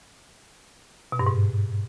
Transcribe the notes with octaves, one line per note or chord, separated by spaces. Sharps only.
B2
G2
G#2